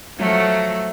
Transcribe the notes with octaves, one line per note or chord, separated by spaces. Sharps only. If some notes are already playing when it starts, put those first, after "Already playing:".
F3 F#3 A3